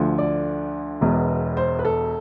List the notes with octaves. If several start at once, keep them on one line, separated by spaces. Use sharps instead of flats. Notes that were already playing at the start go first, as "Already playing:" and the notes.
Already playing: D2 D3 F3
D5
E1 E2 B2
C5
B4
A4